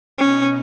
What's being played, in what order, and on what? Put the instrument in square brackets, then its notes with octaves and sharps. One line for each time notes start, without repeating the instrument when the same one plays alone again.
[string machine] B2 B3 D#4 [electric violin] C#4